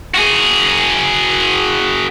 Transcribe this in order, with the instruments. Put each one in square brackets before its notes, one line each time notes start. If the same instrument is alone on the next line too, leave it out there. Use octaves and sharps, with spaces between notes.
[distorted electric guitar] F#4 G#4